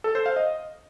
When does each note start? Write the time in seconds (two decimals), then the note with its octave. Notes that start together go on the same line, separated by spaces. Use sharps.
0.04 A4
0.15 C5
0.26 F5
0.36 D#5